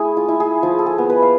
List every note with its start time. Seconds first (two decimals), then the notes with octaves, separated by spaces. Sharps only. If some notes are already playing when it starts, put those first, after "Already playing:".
Already playing: A3 E4 G#4
0.17 F4
0.28 E4
0.40 G#4
0.63 F3 F4
0.79 A4
0.86 G#4
0.98 B3
1.10 B4
1.22 F5